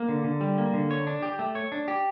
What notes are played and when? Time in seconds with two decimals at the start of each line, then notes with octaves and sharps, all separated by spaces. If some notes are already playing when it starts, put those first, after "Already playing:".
Already playing: A#3
0.09 D3
0.24 D3
0.41 G3
0.58 A#3
0.73 D3
0.91 C#5
1.07 D4
1.22 G4
1.39 A3
1.55 C#5
1.72 D4
1.88 G4